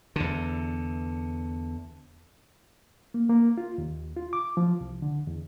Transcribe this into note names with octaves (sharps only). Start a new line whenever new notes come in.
E2 D3
A#3
A#3
F4
D#2
F4
D6
F3
C2
D3
E2